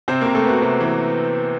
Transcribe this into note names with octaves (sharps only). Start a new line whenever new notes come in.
C3 C4 C5
C3 A#3 A#4
A3 A4
B3 F#4
C3
E3